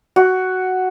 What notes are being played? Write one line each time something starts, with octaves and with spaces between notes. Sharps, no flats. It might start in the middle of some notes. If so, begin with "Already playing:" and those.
F#4